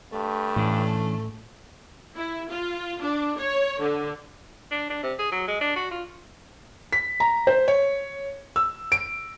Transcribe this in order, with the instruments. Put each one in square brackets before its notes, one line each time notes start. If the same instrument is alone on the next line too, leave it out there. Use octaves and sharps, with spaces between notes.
[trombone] G2 [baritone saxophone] A3
[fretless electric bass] A2 [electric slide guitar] E3 C#4 D4
[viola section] E4
F4
D4
C#5
D3
[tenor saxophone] D4
D4
C3
G#4
F#3
G#3
D4
F#4
F4
[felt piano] B6
A#5
C5
C#5
E6
D7